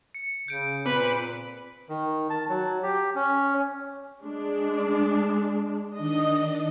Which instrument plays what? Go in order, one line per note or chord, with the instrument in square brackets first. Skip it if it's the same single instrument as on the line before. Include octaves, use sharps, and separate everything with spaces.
[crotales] C#7
[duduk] C#3 [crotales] G6 D7
[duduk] A#2 [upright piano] C4 [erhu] B4 [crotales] D6
[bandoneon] D#3
A5
F#3
G4
C#4
[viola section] G#3 D4
[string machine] D#3 D4 [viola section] D#5